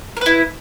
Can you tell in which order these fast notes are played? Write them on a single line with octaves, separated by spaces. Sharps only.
A#4 B4 E4